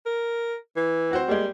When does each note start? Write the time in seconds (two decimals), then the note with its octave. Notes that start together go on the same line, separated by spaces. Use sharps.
0.06 A#4
0.76 E3
1.11 C4 F#4 C5
1.28 G3 G#3 A#3